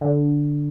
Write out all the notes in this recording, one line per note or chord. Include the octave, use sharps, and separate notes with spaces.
D3